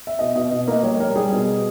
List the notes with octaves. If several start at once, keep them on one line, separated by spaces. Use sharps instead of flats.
E5
B2 D#5
B2 D#5
B2
A#3 D#5
G3 C#5
G3 A#4
G3 G#4
B2